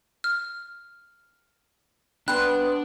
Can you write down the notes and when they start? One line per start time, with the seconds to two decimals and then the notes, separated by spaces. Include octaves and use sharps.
0.24 F6
2.28 G3 B3 D4 C6 F#6